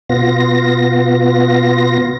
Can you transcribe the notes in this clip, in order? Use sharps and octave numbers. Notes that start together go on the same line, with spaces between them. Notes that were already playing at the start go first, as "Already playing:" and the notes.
B2 B3 F4 A#6